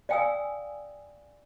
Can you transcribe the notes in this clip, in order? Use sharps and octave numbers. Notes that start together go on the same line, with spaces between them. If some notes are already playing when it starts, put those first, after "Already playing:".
D5 F5 G5 G#5 D#6 E6